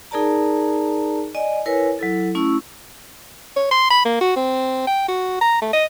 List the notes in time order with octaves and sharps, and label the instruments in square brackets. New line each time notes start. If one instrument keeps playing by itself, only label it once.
[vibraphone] D#4 G#4 A#4 D5 A5 A#5
D5 D#5 G#5
E4 A#4 B4 C#5 G#5
F#3 E4 A4
A3 C#4 E4 C#6 E6
[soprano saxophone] C#5
C6
B5
A#3
F#4
C4
G5
F#4
A#5
A3
D#5